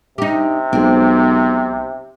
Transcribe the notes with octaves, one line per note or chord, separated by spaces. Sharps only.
C3 D#4 G4
B1 G#3 C4